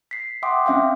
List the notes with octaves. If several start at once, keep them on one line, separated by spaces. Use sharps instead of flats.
B6 C7
E5 F#5 G5 C6 D6 D#6
C4 C#4 E5 F5 G5